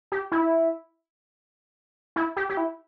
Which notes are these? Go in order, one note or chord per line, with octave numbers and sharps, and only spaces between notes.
G4
E4
E4
G4
G4
E4